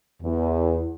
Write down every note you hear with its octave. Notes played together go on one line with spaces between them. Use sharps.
E2